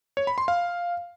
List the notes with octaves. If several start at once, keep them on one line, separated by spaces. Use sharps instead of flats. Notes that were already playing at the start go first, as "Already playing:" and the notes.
C#5
B5
C6
F5